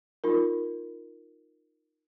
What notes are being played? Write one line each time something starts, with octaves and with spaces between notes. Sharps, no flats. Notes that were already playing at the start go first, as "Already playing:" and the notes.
D#4 F4 A#4